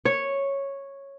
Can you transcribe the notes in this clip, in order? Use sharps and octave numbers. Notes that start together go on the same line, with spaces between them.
C#5